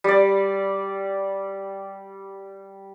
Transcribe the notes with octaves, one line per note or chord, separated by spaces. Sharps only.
G3 D5